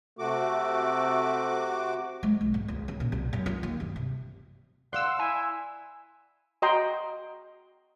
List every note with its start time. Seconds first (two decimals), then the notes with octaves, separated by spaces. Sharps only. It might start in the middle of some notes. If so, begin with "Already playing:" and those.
0.19 C3 A3 F#4 D6
2.23 G#3
2.41 B1
2.54 G#2
2.68 C#2
2.88 C#3
3.00 A#2
3.12 C2
3.33 F#2
3.46 F4
3.63 D#2
3.80 G2
3.96 C3
4.93 D5 F5 F#5 C6 E6
5.19 E4 G#5
6.62 F#4 D#5 G5 A#5 C6